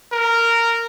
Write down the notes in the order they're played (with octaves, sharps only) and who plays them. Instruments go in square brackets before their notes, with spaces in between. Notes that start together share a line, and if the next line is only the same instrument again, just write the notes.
[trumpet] A#4